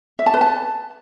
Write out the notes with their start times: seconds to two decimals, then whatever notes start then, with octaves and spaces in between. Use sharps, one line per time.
0.19 E5
0.26 A5
0.34 B4
0.41 A5